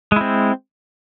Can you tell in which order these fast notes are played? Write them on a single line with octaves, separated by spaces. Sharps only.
G#3 E4 C4